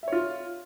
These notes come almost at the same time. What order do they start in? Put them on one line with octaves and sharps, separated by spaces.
E5 C#5 F4